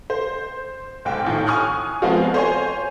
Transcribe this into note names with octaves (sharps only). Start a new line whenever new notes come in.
C5
B1 G#2 G5
A#1 A2 D#3
G#5 C#6 D#6 F6 F#6
F3 G#3 B3 C4 F4 F#4
C5 C#5 G#5